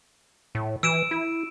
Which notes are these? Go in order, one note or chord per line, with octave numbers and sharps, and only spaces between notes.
A2
E3 E6 D7 E7
E4